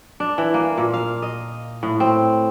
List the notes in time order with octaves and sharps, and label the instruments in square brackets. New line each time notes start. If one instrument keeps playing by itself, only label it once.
[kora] D4
E3
A#3
A#2
F5
D#5
A2
C4